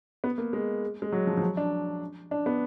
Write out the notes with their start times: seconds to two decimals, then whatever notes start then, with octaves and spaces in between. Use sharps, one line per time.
0.24 B3
0.38 A#3
0.53 G#3
1.02 G#3
1.12 F#3
1.27 F3
1.37 F3
1.42 F#3
1.57 D4
2.31 D4
2.46 B3